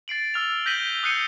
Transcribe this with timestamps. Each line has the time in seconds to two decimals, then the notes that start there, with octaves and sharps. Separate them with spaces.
0.08 A6 C7 D7 F#7
0.34 E6 F6 F7
0.66 G6 A#6 B6 D#7 F#7 G7
1.03 D#6 F#6 G6 C7 C#7 D#7